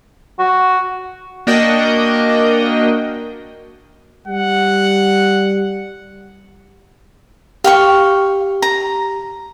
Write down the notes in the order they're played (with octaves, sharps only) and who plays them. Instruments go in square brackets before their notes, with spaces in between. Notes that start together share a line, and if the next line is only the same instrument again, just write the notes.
[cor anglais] F#4
[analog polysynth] A#3 D4 F#4 A#4 D#5 G5
[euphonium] G3 [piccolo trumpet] F#5
[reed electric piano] G4 [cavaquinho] F5 G5 C#6
[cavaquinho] A#5